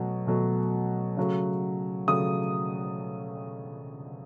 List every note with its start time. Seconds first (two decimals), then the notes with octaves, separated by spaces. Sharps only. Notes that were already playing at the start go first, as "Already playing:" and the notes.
Already playing: B2 F#3 A3
0.27 B2 F#3 A3
1.17 C#3 F#3 A3
2.08 C#3 F#3 A3 D#6